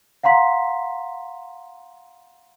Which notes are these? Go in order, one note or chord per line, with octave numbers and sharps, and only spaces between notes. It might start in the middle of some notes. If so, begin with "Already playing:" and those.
F5 F#5 A#5 C6 B6